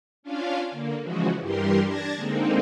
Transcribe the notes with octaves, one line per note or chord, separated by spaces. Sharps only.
C#4 D4 F4 F5
D3 A#3
C#3 E3 F3 G#3 F#4
G2 E3 G3 G4 A#4 C6
D4 A5 G#6 A#6
D3 G#3 A#3 C4 D#4